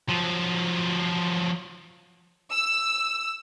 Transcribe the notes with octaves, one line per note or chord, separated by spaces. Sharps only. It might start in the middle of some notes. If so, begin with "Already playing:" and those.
F3 F#3
E6